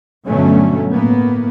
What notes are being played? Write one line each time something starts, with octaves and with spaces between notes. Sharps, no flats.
G2 B2 D3 F#3 A3 C#4
A2 A#3 B3